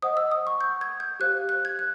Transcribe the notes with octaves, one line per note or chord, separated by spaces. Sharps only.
C5 D#5 F#5 D#6
E6
D#6
C#6
G6
G#6
G6
G4 C5 F5 F#6
F#6
G#6
F#6